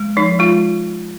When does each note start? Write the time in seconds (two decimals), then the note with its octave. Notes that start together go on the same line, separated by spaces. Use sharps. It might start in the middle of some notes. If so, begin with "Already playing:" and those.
Already playing: G#3
0.17 F3 D#4
0.39 G#3 F4